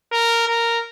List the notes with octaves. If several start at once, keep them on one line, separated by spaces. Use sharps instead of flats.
A#4
A#4